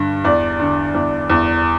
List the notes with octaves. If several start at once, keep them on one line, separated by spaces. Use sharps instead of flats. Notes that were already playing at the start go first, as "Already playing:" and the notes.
Already playing: G2 D3
E2 D5
D3
E2
E2